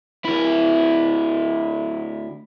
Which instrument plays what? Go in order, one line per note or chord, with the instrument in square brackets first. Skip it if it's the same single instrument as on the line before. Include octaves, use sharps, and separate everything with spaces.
[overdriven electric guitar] D2 E4